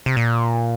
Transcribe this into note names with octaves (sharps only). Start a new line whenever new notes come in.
C3
A#2